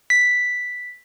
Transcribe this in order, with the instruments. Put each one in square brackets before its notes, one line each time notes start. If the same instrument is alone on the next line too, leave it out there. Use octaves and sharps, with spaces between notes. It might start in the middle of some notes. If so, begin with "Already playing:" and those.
[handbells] B6